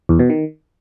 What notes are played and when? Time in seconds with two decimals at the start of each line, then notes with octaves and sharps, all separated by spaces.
0.09 E2
0.19 B2
0.30 D#3